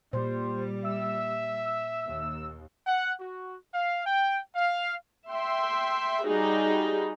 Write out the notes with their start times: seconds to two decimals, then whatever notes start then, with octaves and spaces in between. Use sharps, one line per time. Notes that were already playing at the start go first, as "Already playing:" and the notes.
0.13 A#2 G3 C5
0.85 E5 E6
2.09 D#2
2.87 F#5
3.20 F#4
3.74 F5
4.06 G5
4.56 F5
5.31 E5 G5 C6
6.25 G3 D#4 F#4 G#4